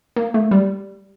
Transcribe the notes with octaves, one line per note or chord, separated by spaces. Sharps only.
A#3
A3
G3